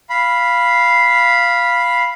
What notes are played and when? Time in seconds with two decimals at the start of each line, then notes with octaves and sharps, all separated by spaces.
0.10 F5 B5